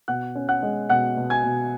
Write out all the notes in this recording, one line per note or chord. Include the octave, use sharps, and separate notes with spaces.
B2 F#5 F#6
C#4
F#5 F#6
G#3
B2 F#5 F#6
B2
G#5 G#6
B2